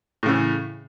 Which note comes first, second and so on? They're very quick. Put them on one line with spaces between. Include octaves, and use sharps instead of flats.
A2 C#3 E3